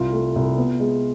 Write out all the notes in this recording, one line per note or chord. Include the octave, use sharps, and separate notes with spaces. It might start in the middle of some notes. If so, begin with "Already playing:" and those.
Already playing: C2 F4
A3
C2
B3
G#3